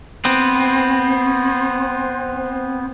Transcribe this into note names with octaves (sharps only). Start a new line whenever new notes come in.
B3 C4